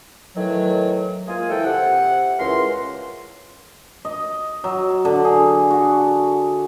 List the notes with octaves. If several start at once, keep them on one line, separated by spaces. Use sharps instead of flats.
A2 D#3 E3 F#3
G#3 A#3 F4 G#4 C5 G#5
E3 A4 G5
C3 F#5
C#2 C#3 E3 A#4 C6
D#5
F#3
D3
G#4
F#4